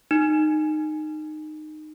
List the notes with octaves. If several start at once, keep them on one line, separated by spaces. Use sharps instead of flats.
D#4